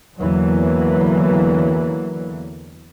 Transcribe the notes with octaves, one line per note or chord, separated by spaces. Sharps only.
E2 D3 E3 F#3 A#3